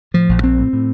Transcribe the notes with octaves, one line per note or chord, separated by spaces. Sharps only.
A2 F3
A#1
A#1 C4
A2
A2